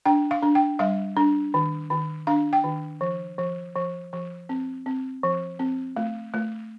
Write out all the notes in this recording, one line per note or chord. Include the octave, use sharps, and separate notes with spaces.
D4 G5
F5
D4
G5
G3 F5
D4
D#3
D#3
D4 F5
G5
D#3
F3
F3
F3
F3
C4
C4
F3
C4
A3
A3